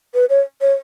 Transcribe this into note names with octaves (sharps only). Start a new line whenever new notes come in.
B4
C#5
C#5